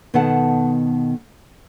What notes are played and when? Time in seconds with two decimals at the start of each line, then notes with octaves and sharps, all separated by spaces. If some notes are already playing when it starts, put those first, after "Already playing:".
0.14 B2 D#3 B3 A4 F#5 A5